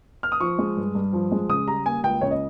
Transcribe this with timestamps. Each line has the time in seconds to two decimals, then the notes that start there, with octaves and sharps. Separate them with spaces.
0.23 F6
0.32 D#6
0.40 F3 C#6
0.59 G#3
0.77 G2
0.95 G2
1.13 F3
1.32 G#3
1.49 C#3 D#6
1.67 G3 A#5
1.86 A#3 G#5
2.03 C#2 G5
2.21 C#3 C#5
2.31 D#5